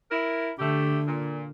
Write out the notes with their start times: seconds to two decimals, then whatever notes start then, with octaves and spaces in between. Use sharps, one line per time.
0.11 E4 A#4
0.59 D3 A3 G4
1.08 A#2